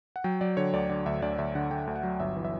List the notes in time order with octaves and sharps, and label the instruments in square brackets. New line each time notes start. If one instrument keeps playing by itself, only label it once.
[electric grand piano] F#5
F#3 G5
F#3 D5
D3 C#5
D2 D5
D3 D5
D2 E5
D2 D5
D2 E5
D3 F#5
D3 G5
D2
F#5
F#3
G1 E5
E3
E5